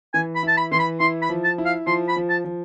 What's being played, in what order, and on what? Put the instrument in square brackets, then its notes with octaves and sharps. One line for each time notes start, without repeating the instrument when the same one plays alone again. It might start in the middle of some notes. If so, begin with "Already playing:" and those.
[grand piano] E3 [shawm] G#5
[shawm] B5
[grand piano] E4 [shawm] A5
[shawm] B5
[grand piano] E3 [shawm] C6
[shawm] B5
[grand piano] E4 [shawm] C6
[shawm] B5
[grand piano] F3
[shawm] A5
[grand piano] E4
[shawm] F5
[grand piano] F3 [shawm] C6
[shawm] B5
[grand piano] F3
[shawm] A5
[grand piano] F3